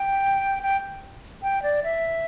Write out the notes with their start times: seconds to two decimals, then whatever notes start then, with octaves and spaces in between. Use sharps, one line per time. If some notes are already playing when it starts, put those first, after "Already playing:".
Already playing: G5
0.63 G5
1.43 G5
1.63 D5
1.84 E5